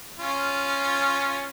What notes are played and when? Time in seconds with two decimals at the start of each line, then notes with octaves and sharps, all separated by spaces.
0.18 C#4 F4